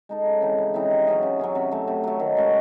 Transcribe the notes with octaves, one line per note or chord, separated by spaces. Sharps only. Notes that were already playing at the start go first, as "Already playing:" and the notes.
G#3 D#4 A4
C#3
E3 C4 D#4
C#3
E3 C4 D#4
C3
F#3 C#4 G#4
C3
F#3 C#4 G#4
C3
F#3 A3
C3
F#3 A3
D#3
G#3 C#4 F#4